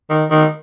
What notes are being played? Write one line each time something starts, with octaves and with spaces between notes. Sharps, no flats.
D#3
D#3